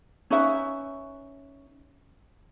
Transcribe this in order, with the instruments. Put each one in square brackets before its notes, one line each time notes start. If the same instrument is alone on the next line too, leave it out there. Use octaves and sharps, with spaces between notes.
[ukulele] C#4 D#4 B4 E5